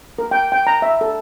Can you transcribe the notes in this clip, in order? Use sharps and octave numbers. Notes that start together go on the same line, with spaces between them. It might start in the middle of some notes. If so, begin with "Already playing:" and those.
A#4
G5
G5
A#5
E5
A4